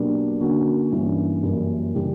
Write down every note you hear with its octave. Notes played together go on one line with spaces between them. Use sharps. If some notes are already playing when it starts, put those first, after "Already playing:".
Already playing: B2 F#3 A#3 D4 G4
D3 A#3 C#4 F#4
G2 E3 A#3 C#4
F#2 E3 G3 A#3
C#3 E3 G3 C#4 G4